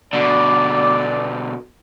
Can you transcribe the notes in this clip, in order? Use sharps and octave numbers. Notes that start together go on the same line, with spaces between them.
B2 D3 D5